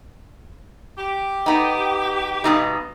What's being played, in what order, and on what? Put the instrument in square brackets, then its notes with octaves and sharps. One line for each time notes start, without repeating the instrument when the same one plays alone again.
[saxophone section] G4
[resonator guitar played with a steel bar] B3 D#4
G2 B2 D#4